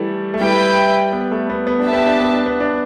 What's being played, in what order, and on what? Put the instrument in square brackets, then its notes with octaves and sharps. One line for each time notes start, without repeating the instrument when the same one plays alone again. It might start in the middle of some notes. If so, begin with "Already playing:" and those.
Already playing: [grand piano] E3 G3 A3
A3
[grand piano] G3 [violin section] E4 B4 G5
[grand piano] B3
A3
B3
B3
D4
[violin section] G4 E5 A5
[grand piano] B3
D4
B3
D4
B3
D4